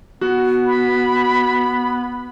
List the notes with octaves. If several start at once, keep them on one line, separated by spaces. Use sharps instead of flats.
B3 F#4
B5